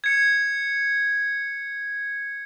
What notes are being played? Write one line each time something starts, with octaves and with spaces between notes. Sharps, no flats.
G#6 C#7